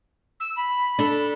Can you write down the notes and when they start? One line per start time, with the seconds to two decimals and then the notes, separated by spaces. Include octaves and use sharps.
0.40 E6
0.56 B5
0.99 D4 A4